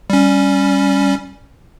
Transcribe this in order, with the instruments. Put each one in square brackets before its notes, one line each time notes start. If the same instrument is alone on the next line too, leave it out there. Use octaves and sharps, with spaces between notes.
[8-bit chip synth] G3 C#4